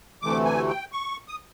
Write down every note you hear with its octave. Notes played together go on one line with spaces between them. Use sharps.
D2 C3 E3 A3 D6
G#5
G5
C#6
D#6